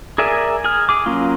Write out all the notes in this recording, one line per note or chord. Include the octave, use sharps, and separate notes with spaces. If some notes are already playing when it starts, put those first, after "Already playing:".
G#4 A#4 D5 E5 G#5
G#4 F6
G#4 D6
F#3 A#3 C#4 F4